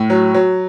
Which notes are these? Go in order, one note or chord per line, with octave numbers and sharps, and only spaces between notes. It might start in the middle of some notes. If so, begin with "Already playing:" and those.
Already playing: A2
F#3
F#3